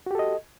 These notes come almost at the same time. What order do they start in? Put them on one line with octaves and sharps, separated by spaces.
F#4 G4 A4 D#5